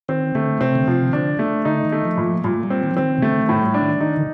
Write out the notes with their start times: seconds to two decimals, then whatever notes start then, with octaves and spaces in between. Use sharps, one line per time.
0.09 D#3 C4
0.35 D3 A3
0.61 C3 C4
0.75 D3
0.87 C3 F3
1.08 D#3
1.13 D3 D4
1.39 A3
1.65 D3 D#4
1.85 D#3
1.92 A3
2.05 F3
2.17 A#2
2.24 F3
2.44 A#2 G3
2.54 A3
2.63 G3
2.70 C4
2.83 D#3
2.91 F3
2.97 D#3 C4
3.18 C3
3.22 D3 A3
3.42 D#3
3.49 A2
3.62 G3
3.74 D4
3.81 D#3
4.00 D#3 D#4
4.17 D3